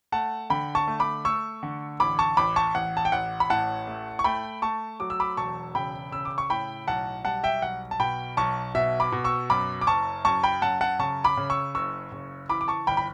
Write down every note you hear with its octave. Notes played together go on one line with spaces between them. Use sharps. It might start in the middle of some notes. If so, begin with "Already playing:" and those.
A3 F#5 A5
D3 G5 B5
A5 C#6
A3
B5 D6
A3 C#6 E6
D3
A1 B5 D6
A5 C#6
A1 B5 D6
A5 C#6
A1 F#5
A5
G5
A1 F#5
B5
A2 F#5 A5
A3
C#6
A3 G5 B5
A3 A5 C#6
F#3 D6
E6
B5 D6
E1 A5 C#6
C#3 G5 B5
C#3 E6
D6
C#6
A2 G5 B5
B1 F#5 A5
G3 F#5 A5
E5 G5
B1 F#5
A5
B2 G5 B5
B1 A5 C#6
B2 E5
B5 D6
B2
C#6 E6
F#2 B5 D6
D6
F#1 A5 C#6
F#2 A5 C#6
G5 B5
F#2 F#5 A5
F#5 A5
C#3 A5 C#6
B5 D6
C#3
C#6 E6
F#1 C#6 E6
C#3
E3 B5 D6
D6
A5 C#6
G1 G5 B5
B5